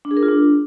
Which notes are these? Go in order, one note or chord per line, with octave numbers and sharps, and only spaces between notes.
D4
G#4
A#4
F4
D4